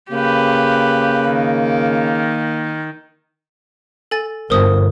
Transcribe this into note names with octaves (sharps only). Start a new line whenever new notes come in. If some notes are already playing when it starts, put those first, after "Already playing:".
C#3 A#3 G4 B4
D#3
A4 G#5 A6
G1 A#4 C5 D#6